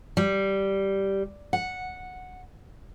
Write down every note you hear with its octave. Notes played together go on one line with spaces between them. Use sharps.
G3
F#5